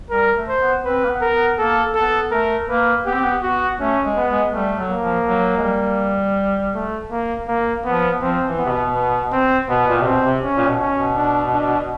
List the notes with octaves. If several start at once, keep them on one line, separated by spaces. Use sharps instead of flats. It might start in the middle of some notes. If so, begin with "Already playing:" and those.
G3 A#4
A3
C5
B3
C4 B4
A#3
B3
A#4
B3
A#3 A4
B3 A4
A3 A#4
A#3 B4
B3 G4
C4
B3
B3 F#4
A3 C#4
G#3
B3
G#3
G3 A3
F#3
A#3
F3
F#3
G#3
G3
A3
A#3
A#3
F3 B3
F3 C4
E3
B3
C3
B2
B3
C4
B2 B3
A#2
C3
B2 C4
C3
C#4
A#2
B2
C#4
B2
D4
D4